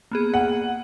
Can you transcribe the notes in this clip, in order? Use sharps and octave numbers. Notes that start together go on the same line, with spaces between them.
A#3 B3 G#4
F#5